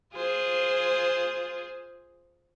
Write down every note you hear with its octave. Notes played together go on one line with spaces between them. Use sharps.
F4 G#4 C5